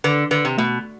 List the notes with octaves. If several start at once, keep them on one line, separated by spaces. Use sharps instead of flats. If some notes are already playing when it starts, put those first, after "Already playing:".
D3 B4
D3 B4
C3
B2 A3